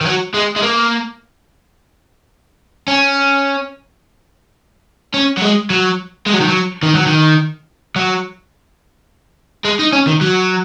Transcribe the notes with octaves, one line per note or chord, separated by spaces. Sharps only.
D#3
F#3
G#3
G#3
A#3
C#4
C#4
F#3
G#3
F#3
G#3
F#3
D#3
F#3
D#3
F#3
D#3
F#3
G#3
D#4
C#4
D#3
F#3